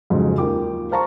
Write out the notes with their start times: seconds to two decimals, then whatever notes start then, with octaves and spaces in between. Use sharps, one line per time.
0.10 F2 G#2 C#3 F#3
0.38 D#2 F4 A#4 G5 D6
0.91 C5 F5 A5 A#5 C6 C#6